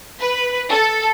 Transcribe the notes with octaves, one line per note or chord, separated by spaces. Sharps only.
B4
A4